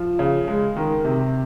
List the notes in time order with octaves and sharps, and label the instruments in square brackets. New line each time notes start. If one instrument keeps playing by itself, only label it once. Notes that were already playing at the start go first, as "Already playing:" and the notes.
Already playing: [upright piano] F3
C#3
G#3
D#3
C3